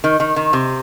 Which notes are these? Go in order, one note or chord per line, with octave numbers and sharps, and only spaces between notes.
D#3
D#3
D#3
C3